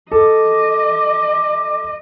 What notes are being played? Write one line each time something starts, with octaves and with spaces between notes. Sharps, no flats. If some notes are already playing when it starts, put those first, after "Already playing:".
A4 D#5 D6